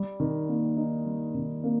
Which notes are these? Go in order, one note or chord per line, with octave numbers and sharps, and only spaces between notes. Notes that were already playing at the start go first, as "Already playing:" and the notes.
Already playing: G3
D#3
A#3
D#4
G3
D#3
A#3